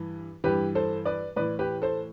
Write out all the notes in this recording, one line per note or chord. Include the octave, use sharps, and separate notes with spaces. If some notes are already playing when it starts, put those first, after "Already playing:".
Already playing: G2 E3
G2 E3 G4 B4
A4 C5
B4 D5
A2 E3 B4 D5
G4 B4
A4 C5